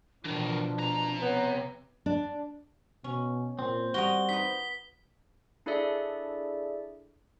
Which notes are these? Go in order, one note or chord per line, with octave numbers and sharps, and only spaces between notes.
B2 E3 F3 D4 A#4
C3 A#5
B3 C#5
D4
B2 C#4
A#2 C4
G3 F#4 A#4 D#5 G7
D#4 B4 B6
D4 E4 G#4 A4 D5 E5